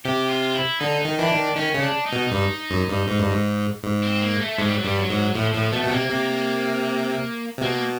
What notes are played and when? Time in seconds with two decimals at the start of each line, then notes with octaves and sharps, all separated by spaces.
0.05 C3 G4
0.29 F4
0.55 E4
0.80 D3 D#4
1.05 D#3
1.19 E3 D4
1.31 D#3
1.56 D#3 C#4
1.74 C#3
1.81 D4
2.06 D#4
2.12 B2
2.32 G2
2.70 F#2
2.89 G2
3.08 G#2
3.19 G2
3.31 G#2
3.83 G#2
4.02 C4
4.21 A#3
4.40 A3
4.58 G#2 G#3
4.67 G3
4.75 F#3
4.83 G2 G3
4.97 F#3
5.10 G#2
5.34 A2 F3
5.53 A2 F3
5.72 B2 A3
5.84 B2
5.91 C3 A#3
6.10 C3
7.58 C3
7.61 B2 A#3